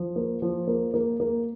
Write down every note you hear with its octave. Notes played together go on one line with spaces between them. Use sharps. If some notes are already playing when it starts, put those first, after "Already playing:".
Already playing: F3
A#3
F3
A#3
A#3
A#3